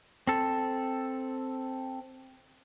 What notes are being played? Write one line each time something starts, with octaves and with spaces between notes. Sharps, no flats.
C4 A4